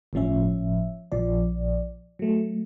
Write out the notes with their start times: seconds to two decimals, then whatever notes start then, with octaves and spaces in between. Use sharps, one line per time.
0.13 G1 A2 F3 C#4 E5
1.12 A#1 F3 D5
2.19 F#3 A3